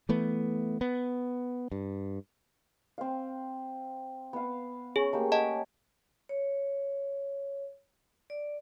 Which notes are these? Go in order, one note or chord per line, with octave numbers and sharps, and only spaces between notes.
E3 A3 B3
B3
G2
C4 F5
B3 F5
C#4 G#4
A3 A#3 G4
D#5 F#5 A5
C#5
D5